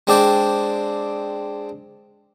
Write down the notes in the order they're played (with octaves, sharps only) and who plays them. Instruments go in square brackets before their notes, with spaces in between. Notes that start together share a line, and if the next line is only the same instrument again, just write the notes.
[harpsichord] G#3 C4 D4 D5 G5